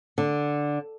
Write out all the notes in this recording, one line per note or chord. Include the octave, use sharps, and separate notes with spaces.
D3